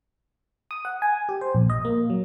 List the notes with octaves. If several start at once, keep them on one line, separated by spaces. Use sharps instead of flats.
D#6
F#5
G#5
G4
C5
A#1
D#5
A#3
F#3